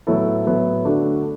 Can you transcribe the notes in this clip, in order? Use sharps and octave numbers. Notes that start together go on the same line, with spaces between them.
A2 F#3 B3 E4 A4
A2 F#3 B3 E4 A4
D3 A3 D4 F#4 A4